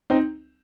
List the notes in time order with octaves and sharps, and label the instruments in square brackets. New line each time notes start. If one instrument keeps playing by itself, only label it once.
[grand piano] C4 D#4